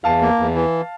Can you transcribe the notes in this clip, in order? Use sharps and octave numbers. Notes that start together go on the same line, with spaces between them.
E2 F5 A5
A#3
E2
E3